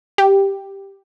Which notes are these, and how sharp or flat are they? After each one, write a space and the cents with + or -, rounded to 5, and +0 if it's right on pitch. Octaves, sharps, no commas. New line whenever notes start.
G4 +0